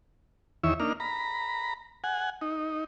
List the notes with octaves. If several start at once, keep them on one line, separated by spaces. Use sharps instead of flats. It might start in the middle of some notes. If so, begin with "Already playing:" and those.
E2 D#3 E4 C#5 E5
A#3 D4 D#4 F6
A#5 B5
F#5 G#5
D#4